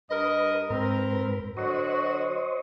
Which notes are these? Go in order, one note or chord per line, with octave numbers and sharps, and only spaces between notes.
G2 A#4 B4 D#5
G#2 C4 A#4 B4
D3 F#3 F#4 C5 C#5 D#5